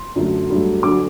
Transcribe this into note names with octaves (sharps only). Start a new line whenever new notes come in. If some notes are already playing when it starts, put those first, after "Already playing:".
Already playing: C6
F#2 D3 F#3 A3
G2 F#3 A3
D2 D3 F#3 D6